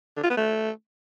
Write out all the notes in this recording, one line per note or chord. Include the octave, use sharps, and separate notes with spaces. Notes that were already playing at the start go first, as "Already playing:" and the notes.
D3
F4
B3
A3